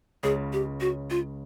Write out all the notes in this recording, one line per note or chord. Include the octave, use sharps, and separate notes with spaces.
C#2 C#3 G#4
G4
F#4
F4